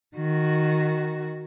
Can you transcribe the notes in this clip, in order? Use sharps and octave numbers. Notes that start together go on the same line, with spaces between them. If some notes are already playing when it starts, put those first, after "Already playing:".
D#3 F#4